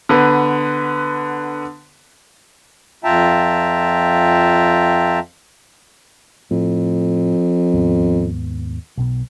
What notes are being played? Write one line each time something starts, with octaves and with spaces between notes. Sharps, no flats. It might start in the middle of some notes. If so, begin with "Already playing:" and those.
D3 B3 B4
F2 F4 E5 G5 A5 A#5
F2 A2
D#2 G#2 B3
B1 B2